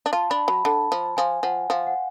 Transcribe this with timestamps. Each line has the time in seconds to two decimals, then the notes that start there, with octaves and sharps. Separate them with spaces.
0.06 D4
0.13 F4 A5
0.30 D4 B5
0.48 F#3 B5
0.65 D3 A5
0.92 F3
1.17 F3 G#5
1.43 F3 F#5
1.70 F3 F5
1.87 F#5